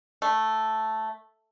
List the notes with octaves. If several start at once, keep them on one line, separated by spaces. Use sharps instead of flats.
A3